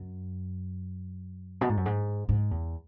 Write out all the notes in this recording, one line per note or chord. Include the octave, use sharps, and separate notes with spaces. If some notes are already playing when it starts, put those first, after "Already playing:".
Already playing: F#2
B2
G#2
F#2
G#2
G#2
E2